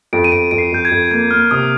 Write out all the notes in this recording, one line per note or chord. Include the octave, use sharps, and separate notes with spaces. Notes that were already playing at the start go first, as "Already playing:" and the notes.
F2 D7
D#7
F2 D7
F2 D7
C7
F2 G6
G#6
F2
A#3 G#6
A#3 F6
C3 D#6